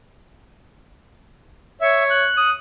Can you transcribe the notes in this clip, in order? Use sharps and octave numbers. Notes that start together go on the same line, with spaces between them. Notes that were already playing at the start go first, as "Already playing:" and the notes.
C#5 E5
F#6
D#6